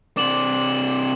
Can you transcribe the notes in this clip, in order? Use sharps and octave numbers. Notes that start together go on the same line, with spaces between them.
C3 D4 D6 E7 F#7